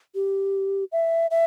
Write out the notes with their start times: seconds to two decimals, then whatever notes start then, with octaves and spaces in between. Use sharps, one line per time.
0.15 G4
0.92 E5
1.31 E5